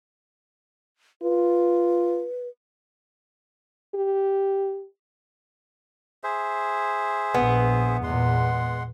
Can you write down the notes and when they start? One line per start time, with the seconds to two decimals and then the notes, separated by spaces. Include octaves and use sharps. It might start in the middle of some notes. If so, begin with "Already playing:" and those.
1.22 F4 B4
3.95 G4
6.24 G#4 C5 E5
7.34 A#1 B3
8.03 E2 A#2 G#3 F#5 C6